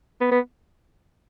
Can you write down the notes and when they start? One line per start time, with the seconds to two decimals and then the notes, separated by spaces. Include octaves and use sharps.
0.21 B3
0.31 B3